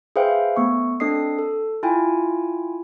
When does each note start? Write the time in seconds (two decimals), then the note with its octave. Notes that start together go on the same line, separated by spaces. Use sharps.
0.16 G#4 B4 C5 E5 F5 G5
0.56 A3 B3 C#6
1.00 C4 D4 A4 D#5 D#6 C7
1.39 A4
1.83 E4 F4 G5 G#5